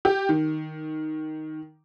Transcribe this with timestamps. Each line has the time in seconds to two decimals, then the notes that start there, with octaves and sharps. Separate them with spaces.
0.05 G4
0.29 D#3